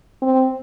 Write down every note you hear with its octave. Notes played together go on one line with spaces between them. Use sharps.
C4